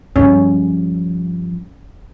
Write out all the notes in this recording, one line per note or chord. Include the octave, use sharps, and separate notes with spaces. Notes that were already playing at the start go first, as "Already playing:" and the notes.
G2 F3 C#4